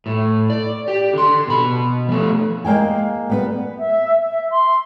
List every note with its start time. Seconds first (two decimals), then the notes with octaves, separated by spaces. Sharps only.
0.06 A2
0.50 D5
0.88 G4
1.13 D3 C6
1.47 B2 B5
2.09 F3 A3
2.65 G#3 A#3 G5 G#5
3.30 G3 B3 B4
3.78 E5
4.28 E5
4.51 C6